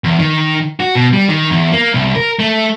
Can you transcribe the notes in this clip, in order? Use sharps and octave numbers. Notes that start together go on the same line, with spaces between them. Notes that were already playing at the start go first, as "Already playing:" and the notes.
E2
D#3
F#4
B2
G3
D#3
E2
A#3
C2
A#4
A3